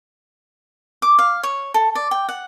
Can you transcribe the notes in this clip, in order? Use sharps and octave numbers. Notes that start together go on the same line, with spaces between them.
D6
F5
C#5
A4
D5
G5
F#5